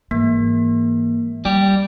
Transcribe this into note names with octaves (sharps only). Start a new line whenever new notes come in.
G#2 E3 A#3
G3 G#3 D#4 G4